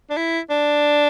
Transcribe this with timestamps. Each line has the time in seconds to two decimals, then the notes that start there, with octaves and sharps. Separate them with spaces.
0.10 D4
0.17 E4
0.50 D4